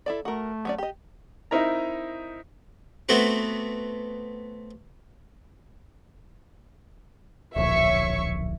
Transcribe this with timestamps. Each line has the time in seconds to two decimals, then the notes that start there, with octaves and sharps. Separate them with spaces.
0.06 E4 A4 D5
0.25 A3 F#4 A#4
0.65 F#3 C#4 D5
0.78 G4 D#5
1.51 C4 D#4 E4 A#4 A#5
3.09 A3 B3 C4 F#4
7.56 D1 A#1 C#5 E5 C#6